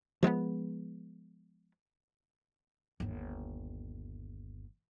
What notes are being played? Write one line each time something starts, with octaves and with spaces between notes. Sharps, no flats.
F3 G#3 A#3 B3
G1 D#2